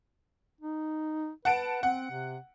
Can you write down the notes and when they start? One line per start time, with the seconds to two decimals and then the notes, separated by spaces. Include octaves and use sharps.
0.61 D#4
1.45 B4 F#5 A5 D7
1.83 C4 F#5
2.10 C3